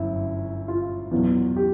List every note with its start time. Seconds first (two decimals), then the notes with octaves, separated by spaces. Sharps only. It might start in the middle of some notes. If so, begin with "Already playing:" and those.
Already playing: G1 F#2 E4
0.68 F4
1.11 E2 B2 F#3
1.57 G4